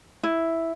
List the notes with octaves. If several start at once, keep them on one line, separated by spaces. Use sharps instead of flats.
E4